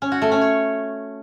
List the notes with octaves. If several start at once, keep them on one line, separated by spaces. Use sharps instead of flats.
C#4
F#4
A3
C#4
C#5